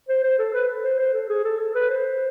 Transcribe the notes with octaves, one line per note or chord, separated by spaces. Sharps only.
C5
C5
A4
B4
C5
C5
A4
G#4
A4
A4
B4
C5